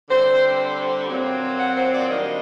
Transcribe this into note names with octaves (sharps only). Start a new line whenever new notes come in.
D3 G3 C4 C5
A#2 F#3 C4
F#5
C5
D5
D#3 G3 A#3 D4 D#5